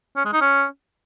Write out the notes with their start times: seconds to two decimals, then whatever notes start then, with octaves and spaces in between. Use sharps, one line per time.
0.17 C#4
0.25 G#3
0.33 D#4
0.41 C#4